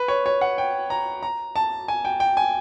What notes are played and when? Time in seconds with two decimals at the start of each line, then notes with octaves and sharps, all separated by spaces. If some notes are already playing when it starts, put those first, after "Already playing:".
Already playing: B4
0.08 C#5
0.26 C#5
0.41 F#5
0.58 G5
0.90 A#5
1.23 A#5
1.56 A5
1.88 G#5
2.05 G5
2.20 G5
2.37 G#5